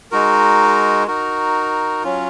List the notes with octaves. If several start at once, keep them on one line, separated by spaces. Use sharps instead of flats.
G#3 D#4 F#4 A#4
D#4 F#4 A#4
F#3 C#4 F4